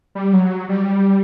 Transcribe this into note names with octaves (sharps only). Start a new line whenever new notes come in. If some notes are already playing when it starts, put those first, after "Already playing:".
G3
F#3
G3